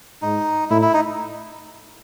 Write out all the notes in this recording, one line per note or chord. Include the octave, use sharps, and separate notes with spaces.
G#2 D#4
A2 E4
E4
D#4